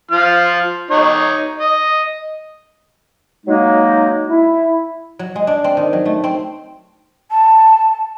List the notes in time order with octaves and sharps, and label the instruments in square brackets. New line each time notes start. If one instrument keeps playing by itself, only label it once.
[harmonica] F3 F4 F6
D#4 C#5
D#5
[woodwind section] F#3 G#3 A#3 D#4
E4
[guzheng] F#3
G#3
D4
C4
D#3
F#3
A3
C4
[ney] A5